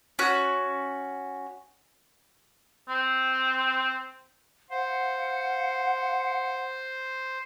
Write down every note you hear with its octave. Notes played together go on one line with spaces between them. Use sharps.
C#4 F#4
C4
C5 F5 F#5